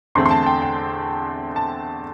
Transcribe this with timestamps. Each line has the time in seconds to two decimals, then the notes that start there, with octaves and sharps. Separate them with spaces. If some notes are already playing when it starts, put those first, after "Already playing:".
0.15 E2 D3 A3 C4 C6
0.26 C6
0.31 A5
0.43 A5
0.46 G5
0.62 G5
1.56 A5